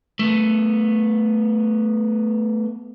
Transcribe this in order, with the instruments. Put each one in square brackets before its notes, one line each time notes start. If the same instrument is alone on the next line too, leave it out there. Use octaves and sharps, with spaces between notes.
[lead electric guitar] A3 B3